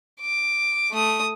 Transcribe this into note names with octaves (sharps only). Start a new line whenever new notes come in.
D6
A3 D#6